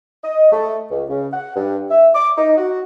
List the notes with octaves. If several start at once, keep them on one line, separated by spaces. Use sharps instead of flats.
D#5
A3
C#2
C#3
F#5
G2
E5
D6
D#4
F#4